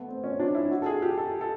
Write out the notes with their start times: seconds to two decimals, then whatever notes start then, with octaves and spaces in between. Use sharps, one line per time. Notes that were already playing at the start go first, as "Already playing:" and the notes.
Already playing: A3 B3
0.08 C4
0.24 C#4
0.39 D4
0.55 E4
0.71 F#4
0.82 A4
0.86 G#4
1.02 G4
1.18 A4
1.41 A4